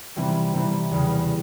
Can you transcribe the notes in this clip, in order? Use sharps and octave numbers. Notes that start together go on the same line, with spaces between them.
C3 E3 G3 C4
C3 E3 G3 C4
E2 C#3 E3 G3